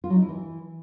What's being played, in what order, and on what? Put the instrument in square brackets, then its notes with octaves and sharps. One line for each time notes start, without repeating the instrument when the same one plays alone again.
[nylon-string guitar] F4
F#3
D#4
E4
E3